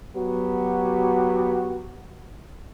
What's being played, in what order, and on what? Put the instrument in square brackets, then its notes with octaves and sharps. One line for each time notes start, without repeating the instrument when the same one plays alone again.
[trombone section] F#3 B3 F#4 G4